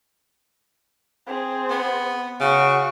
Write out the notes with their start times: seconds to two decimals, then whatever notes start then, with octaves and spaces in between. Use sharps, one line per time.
1.27 C4 G#4
1.70 B3
2.40 C#3 F#4 C#6